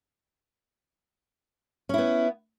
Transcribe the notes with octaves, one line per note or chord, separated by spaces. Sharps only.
B3 C#4 E4